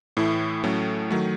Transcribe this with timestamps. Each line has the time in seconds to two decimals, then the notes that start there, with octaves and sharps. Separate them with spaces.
0.17 A2 E3 A3 E4
0.64 A2 F#3 A3 C#4
1.11 D#3 F#3 A3